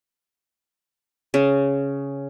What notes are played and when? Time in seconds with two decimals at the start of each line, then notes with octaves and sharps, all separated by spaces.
1.34 C#3